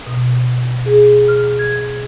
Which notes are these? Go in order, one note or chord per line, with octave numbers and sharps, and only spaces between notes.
B2
G#4
F6
G#6